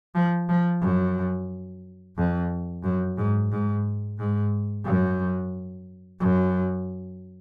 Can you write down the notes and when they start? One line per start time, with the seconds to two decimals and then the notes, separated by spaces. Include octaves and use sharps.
0.15 F3
0.49 F3
0.82 F#2
2.17 F2
2.84 F#2
3.18 G#2
3.52 G#2
4.19 G#2
4.85 F#2
6.20 F#2